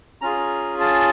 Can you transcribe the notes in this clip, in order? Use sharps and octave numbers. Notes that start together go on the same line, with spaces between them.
C#4 F4 G#4 A#5
A5